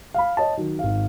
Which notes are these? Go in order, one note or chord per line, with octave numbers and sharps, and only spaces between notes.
F5 B5
C#5 D#5 A5
D#3 F#3
G#1 F5